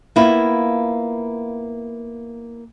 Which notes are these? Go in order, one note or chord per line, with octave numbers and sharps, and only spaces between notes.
A#3 B3 E4 F4